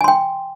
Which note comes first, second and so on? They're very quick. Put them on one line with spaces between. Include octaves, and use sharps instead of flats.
G#5 C6 G5